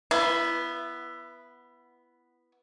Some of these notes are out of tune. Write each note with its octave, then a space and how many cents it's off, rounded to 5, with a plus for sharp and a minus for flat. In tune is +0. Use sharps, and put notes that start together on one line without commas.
B3 +0 E4 +25